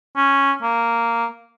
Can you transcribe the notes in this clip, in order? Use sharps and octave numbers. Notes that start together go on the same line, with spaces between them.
C#4
A#3